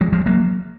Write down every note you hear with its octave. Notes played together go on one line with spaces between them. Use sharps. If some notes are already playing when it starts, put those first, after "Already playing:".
F3 G#3
F3 G#3
F#3 A#3